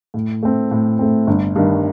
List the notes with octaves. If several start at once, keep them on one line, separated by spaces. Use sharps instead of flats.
A2
A3 C4
A2
A3 C4
G1
G2 D#3